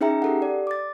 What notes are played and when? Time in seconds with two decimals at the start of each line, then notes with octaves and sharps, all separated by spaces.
0.01 C#4 D#4 G#4 E5 G5 A#5
0.22 G4 A4 F#5
0.42 D5
0.67 D6 A6